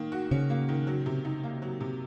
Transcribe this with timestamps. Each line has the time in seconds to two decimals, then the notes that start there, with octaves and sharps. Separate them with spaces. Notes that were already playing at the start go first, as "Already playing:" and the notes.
Already playing: D#3 A#3
0.12 F#4
0.31 C#3 C#4
0.50 A#3
0.69 D#3
0.87 F#3
1.06 C3
1.25 D#4
1.43 A#3
1.62 F#3
1.81 C3